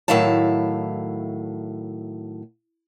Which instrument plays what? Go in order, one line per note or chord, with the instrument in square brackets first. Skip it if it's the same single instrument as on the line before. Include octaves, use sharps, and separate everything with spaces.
[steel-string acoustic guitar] A2 D#3 F#3 E4 F5 A5